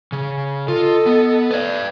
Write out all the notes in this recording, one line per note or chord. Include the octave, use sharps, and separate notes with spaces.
C#3
F4 A4 D#5
B3
B4 D5